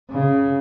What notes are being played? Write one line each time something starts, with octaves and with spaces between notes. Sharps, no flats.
C#3